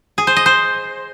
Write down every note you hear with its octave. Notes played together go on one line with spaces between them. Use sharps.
G#4
C5
D#5
C5